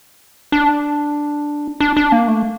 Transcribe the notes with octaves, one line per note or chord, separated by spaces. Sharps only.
D4
D4
D4
A#3
A3